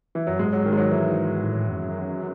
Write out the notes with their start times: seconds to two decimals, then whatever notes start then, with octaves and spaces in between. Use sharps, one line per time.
0.15 E3
0.27 F#2 F#3
0.39 G#2 G#3
0.53 F#3
0.66 D#3
0.72 G#3
0.77 F#3
0.91 E3
1.43 A2
1.69 F#2